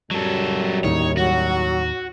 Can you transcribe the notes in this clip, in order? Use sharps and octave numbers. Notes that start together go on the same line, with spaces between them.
F#2 F#3 G3 A4
D#2 A2 D#3 D#4 C#5
F#3 F#4